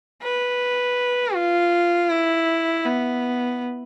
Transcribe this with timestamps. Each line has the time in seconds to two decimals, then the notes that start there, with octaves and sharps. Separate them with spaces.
0.23 B4
1.35 F4
2.10 E4
2.86 B3